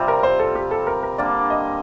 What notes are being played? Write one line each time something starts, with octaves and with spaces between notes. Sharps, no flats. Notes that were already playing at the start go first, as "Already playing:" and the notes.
Already playing: C3 G3 C4 F4
A#4
C5
A4
G4
A4
A#4
A#4
D3 G3 A#3 D5
D#5